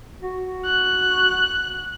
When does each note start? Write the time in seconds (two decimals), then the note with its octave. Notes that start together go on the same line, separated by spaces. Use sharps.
0.22 F#4
0.66 F#6